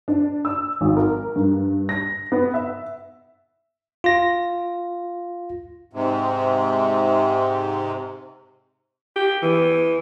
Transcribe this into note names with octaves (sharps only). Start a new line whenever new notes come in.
D4
E6
G#1
A#4
G2
A#6
B3
E5
F4 A#6
G#2 C3
G4
E3